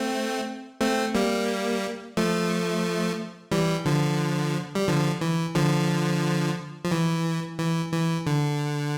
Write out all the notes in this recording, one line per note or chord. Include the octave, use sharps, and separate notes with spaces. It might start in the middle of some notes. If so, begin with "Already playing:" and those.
Already playing: A3 C4
A3 C4
G3 A#3
F3 A3
E3 G3
D3 F3
G3
D3 F3
E3
D3 F3
F3
E3
E3
E3
D3